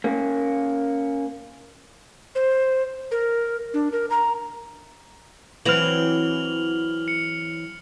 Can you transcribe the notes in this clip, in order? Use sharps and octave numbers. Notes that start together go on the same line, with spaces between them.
A#3 C#4
C5
A#4
D4
A#4
A#5
E3 F#3 C4 F6 F7 F#7
C#7